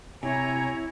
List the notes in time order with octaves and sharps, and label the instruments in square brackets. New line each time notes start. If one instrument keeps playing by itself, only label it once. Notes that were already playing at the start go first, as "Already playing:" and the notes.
[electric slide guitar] C3 [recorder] E4 [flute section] C#5 A#5 [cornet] G#5